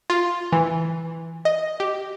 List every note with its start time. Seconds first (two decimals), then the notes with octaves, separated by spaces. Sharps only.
0.10 F4
0.52 E3
1.45 D#5
1.80 G4